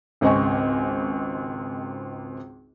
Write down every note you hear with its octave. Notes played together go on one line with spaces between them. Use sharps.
G#1 C#2 C4 D#5 G#5 C#6